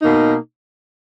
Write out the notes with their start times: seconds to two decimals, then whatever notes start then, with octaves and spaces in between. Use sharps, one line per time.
0.01 B2 A#3 D#4